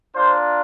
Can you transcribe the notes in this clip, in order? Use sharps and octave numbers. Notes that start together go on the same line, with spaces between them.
A#3 D4 F4 C5